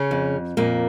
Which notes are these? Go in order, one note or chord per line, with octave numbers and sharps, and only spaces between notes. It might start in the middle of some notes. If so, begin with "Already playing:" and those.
Already playing: C#3 C#4
F2
F2 A#2 A#3